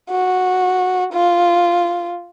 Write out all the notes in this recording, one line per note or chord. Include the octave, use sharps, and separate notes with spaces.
F#4
F4